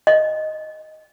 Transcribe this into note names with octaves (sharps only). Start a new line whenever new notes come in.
D#5